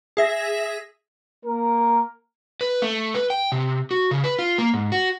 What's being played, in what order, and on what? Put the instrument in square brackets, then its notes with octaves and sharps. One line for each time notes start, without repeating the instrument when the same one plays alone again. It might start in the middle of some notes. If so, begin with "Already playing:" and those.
[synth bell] G#4 E5 A#6
[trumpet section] A#3 A#4
[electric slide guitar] B4
A3
B4
G5
C3
F#4
C#3
B4
F4
A#3
G#2
F#4